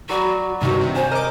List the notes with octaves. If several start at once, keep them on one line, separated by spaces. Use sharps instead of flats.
F#3 F#4 D5 B5
G2 C3 D#3 F#4
C3
C5 G#5
A#4 D#5 D6